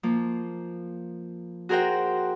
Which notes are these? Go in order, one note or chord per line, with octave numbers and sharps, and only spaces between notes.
F3 A#3
F#4 G#4 A#4 C5 F#5 G5